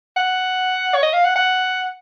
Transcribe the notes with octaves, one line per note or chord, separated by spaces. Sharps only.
F#5
C#5
D#5
F5
F#5
F#5